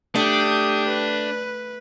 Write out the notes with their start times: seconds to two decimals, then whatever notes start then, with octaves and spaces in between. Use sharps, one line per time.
0.16 A3 D4 G4 D#6 G6
0.87 B4